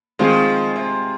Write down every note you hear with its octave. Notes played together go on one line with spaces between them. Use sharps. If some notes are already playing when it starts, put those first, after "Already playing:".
D#3 F3 G#3 C4 F4 G#4
C3